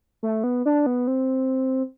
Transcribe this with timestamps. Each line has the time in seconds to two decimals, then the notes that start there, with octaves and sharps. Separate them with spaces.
0.23 A3
0.44 B3
0.66 D4
0.86 B3
1.08 C4